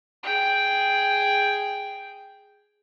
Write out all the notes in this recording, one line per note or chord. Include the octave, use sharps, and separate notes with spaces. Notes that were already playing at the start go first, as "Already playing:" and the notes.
G#4 G5